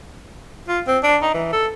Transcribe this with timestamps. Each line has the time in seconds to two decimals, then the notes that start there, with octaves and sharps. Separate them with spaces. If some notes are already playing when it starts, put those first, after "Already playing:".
0.68 F4
0.87 C4
1.03 D4
1.22 D#4
1.34 E3
1.53 A4